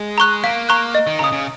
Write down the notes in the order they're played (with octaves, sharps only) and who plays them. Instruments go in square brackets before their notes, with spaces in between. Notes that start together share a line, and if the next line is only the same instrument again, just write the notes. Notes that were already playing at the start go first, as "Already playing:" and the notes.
Already playing: [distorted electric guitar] G#3
[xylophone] A#5 C#6 F#6
[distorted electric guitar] A#3 [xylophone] F5
[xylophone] A#5 C#6 F#6
D#5
[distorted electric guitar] D#3
[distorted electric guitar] C#3 [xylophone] A#5
[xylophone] D#6
[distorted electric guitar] C#3